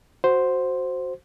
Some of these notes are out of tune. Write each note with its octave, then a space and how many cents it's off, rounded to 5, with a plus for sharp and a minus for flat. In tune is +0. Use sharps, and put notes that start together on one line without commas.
F#4 +0 C5 +0